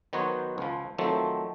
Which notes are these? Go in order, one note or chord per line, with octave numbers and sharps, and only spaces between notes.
D#3 F#3 B3 F#4 C5 C#5
C#2 F3
D#3 F3 F#3 A3 C4